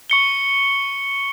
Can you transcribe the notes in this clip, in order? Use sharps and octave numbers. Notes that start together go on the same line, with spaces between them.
C#6 C#7 G7